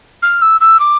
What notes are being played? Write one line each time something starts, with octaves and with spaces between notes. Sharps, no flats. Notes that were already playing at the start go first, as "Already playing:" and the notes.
F6
E6
E6
D6